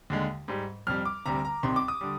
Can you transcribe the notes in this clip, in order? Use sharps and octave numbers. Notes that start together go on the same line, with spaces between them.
D#2 D3 G#3
G#2 G3
F2 C3 G3 F6
D6
D2 C3 G3 A#5
A#5
C2 C3 D#3 C6
D6
D#6
D3 G3